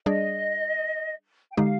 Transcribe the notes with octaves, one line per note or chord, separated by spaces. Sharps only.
G3 D4 G#4 D5 D#5
G5
D3 G#3 D#4 G4 F5